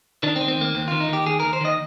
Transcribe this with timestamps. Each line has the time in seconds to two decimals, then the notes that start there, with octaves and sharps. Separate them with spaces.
0.23 D#3 D4
0.36 C4
0.41 D#3
0.48 C4
0.58 D#2 A#3
0.75 D#2 C4
0.88 D#3 F4
1.00 D#4
1.09 D#3 G4
1.26 D#2 G#4
1.40 D#2 A#4
1.53 C5
1.61 D#3 D#5